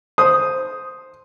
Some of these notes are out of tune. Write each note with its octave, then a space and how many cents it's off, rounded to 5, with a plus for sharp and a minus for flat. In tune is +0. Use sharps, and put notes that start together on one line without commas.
C5 +0 D#6 +0